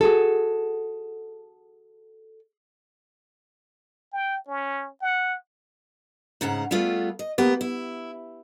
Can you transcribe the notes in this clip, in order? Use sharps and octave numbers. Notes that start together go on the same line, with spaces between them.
F#4 G#4 A4
G5
C#4
F#5
G#2 C#3 F#5 A#5
G3 A3 B3 F4 G#4 A4
D#5
A#3 B3 G4
E4